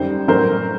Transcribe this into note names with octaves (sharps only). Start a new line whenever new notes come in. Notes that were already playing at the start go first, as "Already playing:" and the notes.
Already playing: F#2 D#3 G3 C5
A2 F#3 A#4 C5